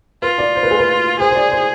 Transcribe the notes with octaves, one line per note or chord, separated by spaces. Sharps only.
F4 B4
D5
C5
B4
G#4
B4
G#4 C5
C5
D5
C5